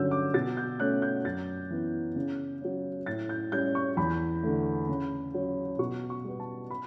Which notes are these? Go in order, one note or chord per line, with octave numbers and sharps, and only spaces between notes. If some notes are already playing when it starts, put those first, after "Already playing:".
Already playing: G2 D3 F#3 C#4 E6 G6
D6
B2 A6
G6
A3 C#4 F#6
G6
F#2 A6
E3 B3
C#3
F#3 C#4
A2 A6
G6
G3 C#4 G6
C#6
E2 B5
D3 A3
C#3
F#3 C#4
B2 C#6
C#6
G3 B3
A5
B5